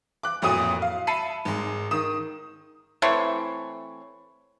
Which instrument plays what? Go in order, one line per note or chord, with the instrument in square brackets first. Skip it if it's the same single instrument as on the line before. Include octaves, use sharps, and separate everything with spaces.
[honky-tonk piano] D6 F#6
A1 F2 A#2 F#4 D#6 D#7
F5
E5 A5 B5 C7 C#7 D#7
G#1 G#3
D#3 D#6 E7
[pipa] E3 A3 C4 C#5